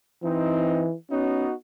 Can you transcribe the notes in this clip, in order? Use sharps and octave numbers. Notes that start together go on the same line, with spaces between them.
E3 C4 D#4
B3 C#4 D#4 F#4